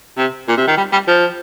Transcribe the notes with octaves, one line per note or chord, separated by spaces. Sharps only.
C3
A#2
C3
D#3
G3
G3
F3